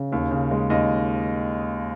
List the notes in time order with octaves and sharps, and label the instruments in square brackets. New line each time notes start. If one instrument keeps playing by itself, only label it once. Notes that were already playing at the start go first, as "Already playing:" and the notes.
Already playing: [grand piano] C#3
D#2
C#3
G#3
D#2 D#5